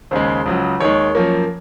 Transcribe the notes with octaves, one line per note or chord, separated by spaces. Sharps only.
D#2 C#3 G#3 C5
C#2 C#3 F#3
D#2 D#3 G#3 C#5
F#2 F3 A#3